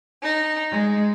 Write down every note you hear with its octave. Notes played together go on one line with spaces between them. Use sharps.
D#4
G#3